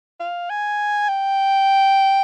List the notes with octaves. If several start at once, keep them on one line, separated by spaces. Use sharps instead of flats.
F5
G#5
G5